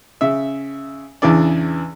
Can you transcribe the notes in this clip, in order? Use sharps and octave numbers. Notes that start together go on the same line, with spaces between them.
C#3 E5
E2 C#3 E3 D4 D5